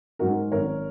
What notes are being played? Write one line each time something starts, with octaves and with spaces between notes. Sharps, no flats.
G#2 F#3 C#4 F#4 A#4
G#1 A#4 C#5